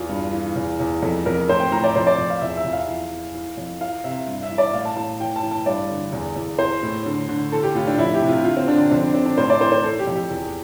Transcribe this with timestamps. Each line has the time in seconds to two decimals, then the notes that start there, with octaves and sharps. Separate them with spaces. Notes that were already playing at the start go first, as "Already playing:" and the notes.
Already playing: E2 F4
0.09 G2
0.33 E3
0.56 E2
0.80 E2
1.02 F2 A4
1.26 F2 A#4
1.49 A2 C5
1.60 G5
1.71 A2 A#5
1.84 D5
1.96 F2 C5
2.07 D5
2.18 F2
2.30 F5
2.41 E2 E5
2.57 E5
2.64 E2
2.73 F5
2.89 E3
3.11 E3
3.35 E3
3.58 F2
3.81 E3 F5
4.04 C3 E5
4.27 G2
4.43 E5
4.51 E3
4.58 D5
4.73 A2 F5
4.85 A5
4.97 A2 A5
5.20 E3 G5
5.36 A5
5.43 E3
5.51 A5
5.66 G2 D5
5.89 D3
6.12 E2
6.36 E2
6.59 E3 C5
6.83 A2
7.06 D3
7.29 D3
7.52 E3 A4
7.63 G4
7.75 A2 F4
7.87 D4
7.98 F2 E4
8.14 G4
8.22 C3
8.29 F4
8.45 D3 F4
8.57 C4
8.67 D3 D4
8.80 D4
8.91 F2 C4
9.02 D4
9.14 D3 C4
9.26 D4
9.38 A2 C5
9.50 D5
9.60 E3 C5
9.72 C5
9.83 E3 A4
9.99 G4
10.07 F2
10.15 G4
10.30 E2